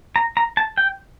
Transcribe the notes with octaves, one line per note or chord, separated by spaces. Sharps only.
A#5
A#5
A5
G5